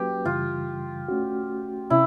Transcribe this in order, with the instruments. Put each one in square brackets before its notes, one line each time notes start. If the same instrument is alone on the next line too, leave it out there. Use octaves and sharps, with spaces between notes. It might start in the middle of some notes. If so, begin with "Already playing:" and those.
Already playing: [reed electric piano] F#3 A#3 C#4 F#4 B4 [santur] G4
[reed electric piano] F#2 C#3 E3 G3 [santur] F4
[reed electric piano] A3 C#4 F#4
[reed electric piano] C3 C#4 [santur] E4